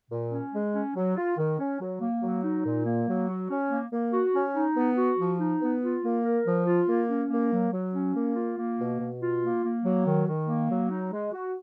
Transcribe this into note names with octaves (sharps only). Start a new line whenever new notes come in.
A#2
C#4
G#3
C#4
F#3
F4
D#3
C#4
F#3
A#3
F#3
D#4
A#2
A#3
F#3
F#4
C#4
A#3
A#3
F#4
C#4
D#4
B3
F#4
F3
D#4
B3
F4
A#3
A#4
F3
F4
A#3
C#4
A#3
F#3
F#3
C#4
A#3
F4
A#3
B2
B2
F4
A#3
A#3
F#3
D#3
D#3
A#3
F#3
D#4
G#3
F#4